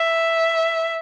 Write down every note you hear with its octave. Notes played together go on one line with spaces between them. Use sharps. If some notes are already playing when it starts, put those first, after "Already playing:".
Already playing: E5